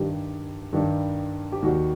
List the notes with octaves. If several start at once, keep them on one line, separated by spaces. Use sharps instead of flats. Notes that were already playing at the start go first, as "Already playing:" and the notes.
Already playing: G2 D#3 G3 G4
G2 D#3 G3
G4
D#2 D#3 G3 F#4